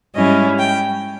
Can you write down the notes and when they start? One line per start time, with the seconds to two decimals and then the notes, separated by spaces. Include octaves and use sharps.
0.14 G#2 G3 C#4 E4 D#5
0.58 G5